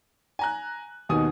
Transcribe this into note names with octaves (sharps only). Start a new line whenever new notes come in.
G#5 A#5 F#6
D#2 B2 D#3 G#5 D#6